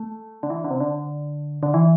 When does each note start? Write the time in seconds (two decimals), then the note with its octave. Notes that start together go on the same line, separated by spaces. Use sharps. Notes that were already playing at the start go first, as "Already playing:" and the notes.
Already playing: A3
0.43 D3
0.50 E3
0.64 D3
0.71 C3
0.80 D3
1.63 D3
1.74 E3